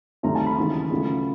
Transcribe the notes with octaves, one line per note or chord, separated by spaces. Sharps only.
D2 C3 D#3 F#3 A3 A#5
A5
B5
D#2 C#3 E3 G#3
C#2 C#3 F#3 A3